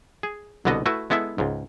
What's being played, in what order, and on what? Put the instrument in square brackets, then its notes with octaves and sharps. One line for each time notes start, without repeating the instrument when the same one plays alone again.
[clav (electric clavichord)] G#4
C2 B2 D3 B3 F#4 D#5
A3 E4 F#4 B4 E5
G#3 B3 E4 A4 E5
C#2 G#2